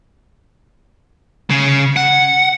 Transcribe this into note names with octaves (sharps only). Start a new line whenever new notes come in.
C#3
F#5